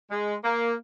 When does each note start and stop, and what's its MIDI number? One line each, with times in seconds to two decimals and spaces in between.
0.11 0.35 56
0.44 0.72 58